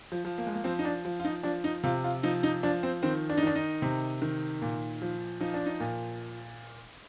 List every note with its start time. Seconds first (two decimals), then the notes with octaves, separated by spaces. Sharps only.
0.12 F3
0.25 F3
0.38 A#3
0.47 G#3
0.54 A#3
0.64 F3 C4
0.79 D#4
0.85 D4
1.05 F3
1.20 F4
1.24 D#4
1.43 F3 D4
1.64 D#4
1.84 C3 F4
2.04 F4
2.23 F3 D#4
2.43 D#4
2.63 F3 D4
2.83 C4
3.03 D#3 C4
3.30 D4
3.37 D#4
3.43 D#3 D4
3.55 D#4
3.82 C3
4.22 D#3
4.62 A#2
5.02 F3
5.41 F3 D#4
5.54 D4
5.66 D#4
5.80 A#2